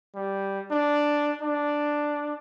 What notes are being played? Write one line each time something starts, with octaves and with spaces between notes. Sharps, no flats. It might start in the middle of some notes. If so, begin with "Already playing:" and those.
G3
D4
D4